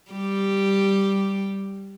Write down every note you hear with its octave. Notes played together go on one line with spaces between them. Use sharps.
G3 G4